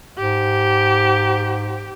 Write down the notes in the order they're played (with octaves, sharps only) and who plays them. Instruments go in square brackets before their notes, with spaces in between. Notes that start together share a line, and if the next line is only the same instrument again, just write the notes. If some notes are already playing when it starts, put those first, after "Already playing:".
[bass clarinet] G#2 [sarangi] G4